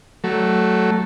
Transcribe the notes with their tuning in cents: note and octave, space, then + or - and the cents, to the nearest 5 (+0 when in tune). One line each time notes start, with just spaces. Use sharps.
F#3 +15 A3 +0